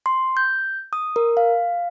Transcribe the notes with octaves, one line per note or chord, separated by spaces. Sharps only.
C6
G6
D#6
A#4
F5